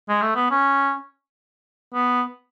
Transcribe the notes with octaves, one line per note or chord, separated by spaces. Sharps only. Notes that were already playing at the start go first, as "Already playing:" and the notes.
G#3
A3
B3
C#4
B3